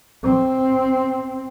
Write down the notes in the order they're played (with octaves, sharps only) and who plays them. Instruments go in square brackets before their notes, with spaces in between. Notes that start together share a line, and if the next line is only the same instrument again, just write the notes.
[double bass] C4